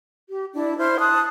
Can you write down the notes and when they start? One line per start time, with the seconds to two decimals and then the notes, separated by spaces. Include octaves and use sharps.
0.30 G4
0.55 D4 E4 D5
0.77 E4 C5 F6
0.98 A5 D#6 F#6